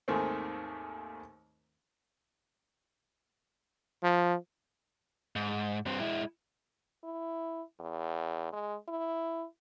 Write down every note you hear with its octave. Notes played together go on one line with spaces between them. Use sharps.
D#2 G#2 D#3 A3 C4
F3
G#2
G2 C4
G#3 E4
E4
E2
G#3
E4